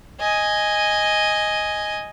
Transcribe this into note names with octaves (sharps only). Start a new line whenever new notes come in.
D#5 G#5